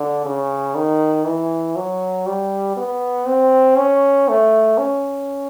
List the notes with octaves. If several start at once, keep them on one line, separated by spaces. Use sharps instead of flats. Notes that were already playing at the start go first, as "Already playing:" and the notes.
Already playing: D3
C#3
D#3
E3
F#3
G3
B3
C4
C#4
A3
C#4